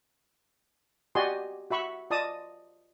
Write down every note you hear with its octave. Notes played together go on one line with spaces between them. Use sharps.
F#4 G4 D5 D#5 G#5 C6
F#4 E5 B5 C#6
F4 D5 D#5 A5 D#6